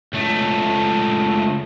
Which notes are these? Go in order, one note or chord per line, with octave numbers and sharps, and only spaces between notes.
C#2 A3